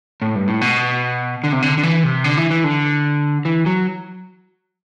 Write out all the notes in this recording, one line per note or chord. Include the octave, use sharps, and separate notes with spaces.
A2
G2
A2
B2
D3
C3
D3
D3
E3
C3
D3
E3
E3
D3
E3
F#3